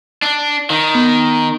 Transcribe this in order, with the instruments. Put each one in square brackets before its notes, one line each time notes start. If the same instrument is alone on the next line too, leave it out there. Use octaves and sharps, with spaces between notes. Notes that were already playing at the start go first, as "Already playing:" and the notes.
[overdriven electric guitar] D4
D#3
[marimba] B3